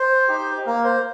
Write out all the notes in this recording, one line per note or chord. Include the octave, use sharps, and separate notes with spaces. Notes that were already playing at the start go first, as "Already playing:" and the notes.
Already playing: C5
D#4 G4
A#3 A#4
C5